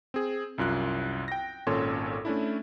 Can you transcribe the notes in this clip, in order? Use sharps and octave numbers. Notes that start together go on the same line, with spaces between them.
C4 G#4
C2 F#2 F4 F#6
G5 A#6
G#1 A#2 C#4 A4 C#5 C6
A3 C#4 D4 E4